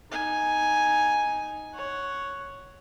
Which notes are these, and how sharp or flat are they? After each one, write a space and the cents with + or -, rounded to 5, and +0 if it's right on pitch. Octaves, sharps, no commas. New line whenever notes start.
D#4 +0 G#5 +0
C#5 +0 F#5 +0